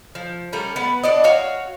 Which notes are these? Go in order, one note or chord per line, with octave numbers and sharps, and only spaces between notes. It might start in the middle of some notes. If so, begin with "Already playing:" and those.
F3
G3 A3 C#4 A#4
B3 B4 F#5
D4 F#4 D5 D#5
F#4 C#5 F5